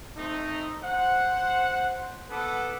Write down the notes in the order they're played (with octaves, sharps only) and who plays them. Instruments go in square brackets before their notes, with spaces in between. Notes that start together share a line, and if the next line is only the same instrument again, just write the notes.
[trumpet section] A3 C4 D#4
C5 F#5
B3 A4 B4 F#5 D6